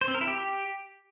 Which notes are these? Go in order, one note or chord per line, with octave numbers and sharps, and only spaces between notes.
C5
C4
A#4
E4
G4